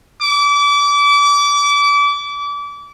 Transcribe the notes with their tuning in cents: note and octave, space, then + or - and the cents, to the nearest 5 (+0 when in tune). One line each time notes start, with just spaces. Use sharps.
D6 -30